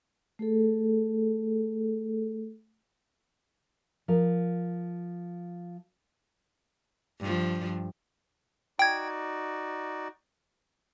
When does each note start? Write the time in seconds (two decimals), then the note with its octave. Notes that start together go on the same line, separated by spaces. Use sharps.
0.39 A3 G#4 A4
4.08 F3 A#4
7.20 G2 F3
8.79 D#4 F#4 D5 G5 G#6